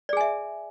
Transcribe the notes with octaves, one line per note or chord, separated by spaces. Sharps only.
G#4 D5 E5 G#5